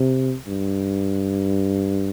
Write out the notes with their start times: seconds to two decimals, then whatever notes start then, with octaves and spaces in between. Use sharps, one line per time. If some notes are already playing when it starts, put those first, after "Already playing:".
Already playing: C3
0.47 G2